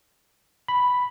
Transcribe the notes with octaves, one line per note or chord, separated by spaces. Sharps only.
B5